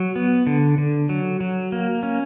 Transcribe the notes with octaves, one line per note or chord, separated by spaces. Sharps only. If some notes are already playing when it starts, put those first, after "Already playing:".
Already playing: F#3
B3
D3
D3
F#3
F#3
A#3
C#4